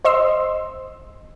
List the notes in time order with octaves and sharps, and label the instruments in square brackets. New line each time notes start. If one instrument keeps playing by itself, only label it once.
[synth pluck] C5 D#5 C6 E6